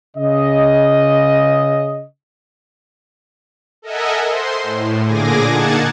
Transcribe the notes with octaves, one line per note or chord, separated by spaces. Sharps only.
C#3 D#5
A4 A#4 D#5 E5 F#5 G#5
C5 C6
A2
A#2 D3 G#4 G#5 D6 A#6
A#3 D#4 F#5 A5 G#6